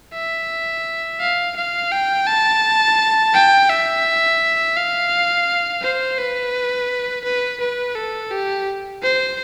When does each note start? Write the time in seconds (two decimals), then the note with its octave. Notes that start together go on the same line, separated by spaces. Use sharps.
0.14 E5
1.20 F5
1.56 F5
1.91 G5
2.27 A5
3.34 G5
3.69 E5
4.76 F5
5.82 C5
6.18 B4
7.24 B4
7.60 B4
7.95 A4
8.31 G4
9.02 C5